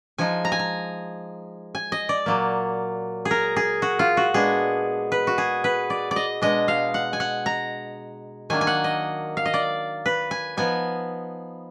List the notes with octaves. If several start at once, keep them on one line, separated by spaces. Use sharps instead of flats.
F3 G#3 D#4 G#5
A#5
G#5
A#5
G#5
D#5
D5
A#2 F#3 A#3
G#4
A#4
G#4
F#4
F4
F#4
A#2 G#3 B3 D4 G#4
B4
F#4
G#4
B4
D5
D5
D#5
B2 G#3 D4 D#5
F5
F#5
G#5
F#5
A#5
D#3 F#3 A#3 D4 G#5
G#5
F#5
D#5
F5
D#5
D5
B4
G#5
F3 B3 D#4 G#5